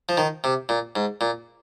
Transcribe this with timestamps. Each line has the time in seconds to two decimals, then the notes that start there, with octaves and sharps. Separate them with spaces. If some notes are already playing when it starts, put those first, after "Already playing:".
0.09 F3
0.17 D#3
0.44 C3
0.69 A#2
0.96 G#2
1.21 A#2